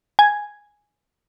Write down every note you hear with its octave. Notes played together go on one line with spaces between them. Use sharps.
G#5 G#6